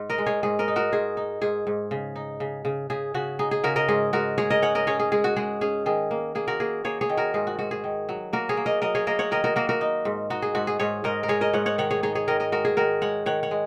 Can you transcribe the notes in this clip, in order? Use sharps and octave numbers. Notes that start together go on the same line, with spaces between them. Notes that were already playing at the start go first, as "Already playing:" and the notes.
Already playing: G#2
A#4 D#5
G#3
G#4 C#5
G#2 G#4
A#4 D#5
D#4
F#4 A#4
G#2 G#4
D#4
G#2 G#4
G#2
C#3
D#4
C#3
C#3
C#3 G#4
C#3 F#4
D#4 G#4
G#4
C#3 F#4 A#4
A#4 D#5
G#2 G#4
G#2 F#4 A#4
G#3 G#4 C#5
A#4 D#5
C#4 C#5 F#5
A#4 D#5
C#4 G#4 C#5
G#4
G#3 G#4
F#4
G#3 G#4
C#4 G#4
D#3 G#4
A#3
A#3 G#4
F#4 A#4
A#3 G#4
A#3 G#4 C#5
G#4 C#5
D#3
F#4 A#4
G#2 G#4
F#4
G#2 F#4
G#4
D#3
F#3
A#3 F#4 A#4
G#4 C#5
A#3
A#4 D#5
F#3 A#4 D#5
G#4 C#5
A#3 A#4 D#5
C#5 F#5
D#3 A#4 D#5
F#4 A#4
A#3 F#4 A#4
F#4 A#4
D#4
G#2
D#4 F#4
G#4
G#2 F#4
G#4
G#2 G#4 C#5
G#2 A#4 D#5
A#4
G#3 G#4 C#5
A#4 D#5
G#2 C#5 F#5
C#5 F#5
D#3 C#5 F#5
G#4 C#5
D#4 G#4 C#5
G#4 C#5
D#3 A#4 D#5
A#4 D#5
G#3 F#4 A#4
G#4
D#3 F#4 A#4
G#3 C#5 F#5
D#3 C#5 F#5
C#5 F#5
G#3